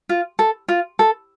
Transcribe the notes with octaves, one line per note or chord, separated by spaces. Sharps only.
F4
A4
F4
A4